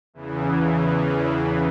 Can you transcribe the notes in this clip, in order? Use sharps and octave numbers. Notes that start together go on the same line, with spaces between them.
E2 C#3 E3